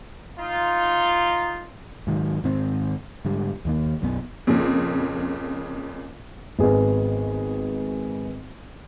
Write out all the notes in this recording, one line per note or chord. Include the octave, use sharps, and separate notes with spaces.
D#4 F4
G#2 D#3 E3 F#3
G#2 D#3 C4
G#2 D3 G3
D#2 D#3 A#3
B1 F#2 D#3 B3
F2 A#2 C#3
G#1 B3 G#4 D#5